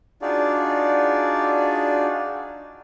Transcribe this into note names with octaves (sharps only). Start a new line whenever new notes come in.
D4 D#4 F4 F#4 G#4 D5